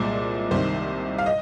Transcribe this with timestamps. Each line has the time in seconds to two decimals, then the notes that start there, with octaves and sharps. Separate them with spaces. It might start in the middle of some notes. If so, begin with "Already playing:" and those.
Already playing: C2 A#2 G#3 C5
0.51 C2 C3 D#3 C5
1.18 F5
1.26 D#5